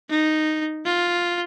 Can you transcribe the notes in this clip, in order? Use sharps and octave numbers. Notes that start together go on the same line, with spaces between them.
D#4
F4